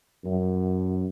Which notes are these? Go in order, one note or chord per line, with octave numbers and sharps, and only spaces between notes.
F#2